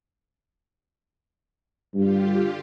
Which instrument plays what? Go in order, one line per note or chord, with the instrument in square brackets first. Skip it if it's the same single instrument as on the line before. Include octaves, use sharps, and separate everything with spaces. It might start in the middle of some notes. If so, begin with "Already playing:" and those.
[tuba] G2 [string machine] D3 F4 G4